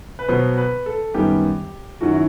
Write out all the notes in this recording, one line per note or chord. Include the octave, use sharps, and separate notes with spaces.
B4
B2 F#3 B3 C5
B4
A4
F#2 D#3 G3 B3 G4
F#2 D#3 F#3 F#4
E4